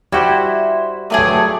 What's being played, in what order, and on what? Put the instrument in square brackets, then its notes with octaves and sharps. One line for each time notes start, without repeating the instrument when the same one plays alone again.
[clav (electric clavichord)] G3 F#4 G4 [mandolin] E4 C5
[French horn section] G2 F#3 A3 [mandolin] G#4 D5 D#6